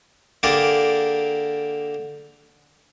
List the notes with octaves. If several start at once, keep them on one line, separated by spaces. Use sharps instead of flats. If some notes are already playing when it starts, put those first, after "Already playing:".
D3 A#3 G4 G#4 A#4 D5